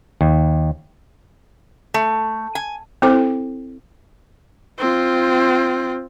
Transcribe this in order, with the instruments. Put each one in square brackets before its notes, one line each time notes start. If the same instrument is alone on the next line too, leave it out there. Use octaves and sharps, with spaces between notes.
[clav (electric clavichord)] D#2
[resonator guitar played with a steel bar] A3
G#5
[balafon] C4 E4 A4 C5 D6
[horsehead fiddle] C4 F4